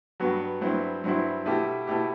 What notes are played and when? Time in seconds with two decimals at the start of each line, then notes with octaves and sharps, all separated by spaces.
0.20 G2 F#3 B3 F#4
0.61 G2 F#3 C4 E4
1.04 G2 F#3 C4 E4
1.46 B2 A3 E4 G4
1.87 B2 A3 E4 G4